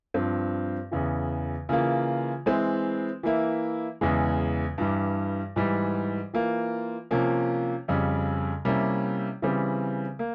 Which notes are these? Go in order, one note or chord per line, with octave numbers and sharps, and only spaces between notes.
G2 F3 C4
E2 C#3 E3
C#3 E3 A#3 F4
E3 G#3 C4 E4
E3 A#3 E4
E2 C#3 E3 G#3
G2 E3 G3
G#2 E3 G3
E3 A#3 F4
C3 F3 A#3 C#4
F2 C#3 G3
C3 G3 A#3 C#4 E4
C#3 E3 G3 C4
A#3